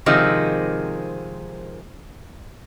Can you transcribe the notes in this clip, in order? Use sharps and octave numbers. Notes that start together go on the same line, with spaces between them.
C3 D#3 F3 G#3 C4